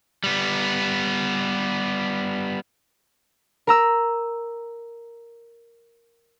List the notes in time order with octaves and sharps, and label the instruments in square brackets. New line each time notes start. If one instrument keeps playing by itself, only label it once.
[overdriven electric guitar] G3 B3
[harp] A#4 A#5 E6